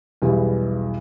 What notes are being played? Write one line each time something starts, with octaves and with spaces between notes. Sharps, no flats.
B1 E2 E3 G3 G#3